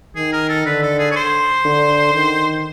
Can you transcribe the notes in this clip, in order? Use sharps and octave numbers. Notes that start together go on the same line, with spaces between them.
D#3 G#4
A#4
A4
D3 B4
A4
G#4
C#5
C5
D3
D#3